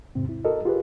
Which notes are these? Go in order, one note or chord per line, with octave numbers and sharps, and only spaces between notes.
E2 G#2 C3 C4
E4
F#4 A4 A#4 D#5
F4 G4 G#4 B4